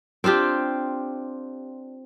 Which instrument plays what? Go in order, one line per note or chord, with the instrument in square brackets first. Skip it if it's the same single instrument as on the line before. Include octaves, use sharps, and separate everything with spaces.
[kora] C4 D4 F4 G4